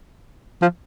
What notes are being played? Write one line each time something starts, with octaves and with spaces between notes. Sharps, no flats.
F3